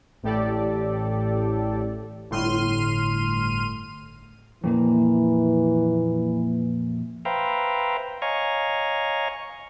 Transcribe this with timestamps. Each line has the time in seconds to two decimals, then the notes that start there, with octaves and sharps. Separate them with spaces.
0.23 A1 A2 G4 A4 D5
2.30 G1 A2 C6 F6 D#7
4.64 F2 A#2 E3 A#3
7.25 B4 C5 E5 F5 G5 A#5
8.22 C#5 D#5 F5 G#5 A#5 C#6